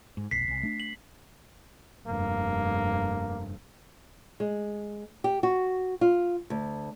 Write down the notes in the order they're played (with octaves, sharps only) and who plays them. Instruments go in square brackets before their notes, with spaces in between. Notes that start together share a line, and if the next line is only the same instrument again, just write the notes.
[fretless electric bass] G#2
[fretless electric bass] F1 B1 [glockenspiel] B6 C7
[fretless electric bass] C2
A3 D4
[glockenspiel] F#7
[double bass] F1 G2 [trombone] A#3
[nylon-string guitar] G#3
G4
F#4
F4
D2